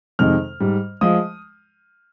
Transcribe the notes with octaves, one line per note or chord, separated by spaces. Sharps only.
F2 C3 D#3 G#3 F6
G#2 G3
F3 G#3 D#6